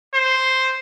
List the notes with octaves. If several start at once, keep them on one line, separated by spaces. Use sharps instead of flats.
C5